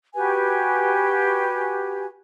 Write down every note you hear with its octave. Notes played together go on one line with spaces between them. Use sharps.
F#4 G4 B4 G#5